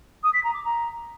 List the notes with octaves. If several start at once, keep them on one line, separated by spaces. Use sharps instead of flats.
D#6
B6
A#5
D6
A#5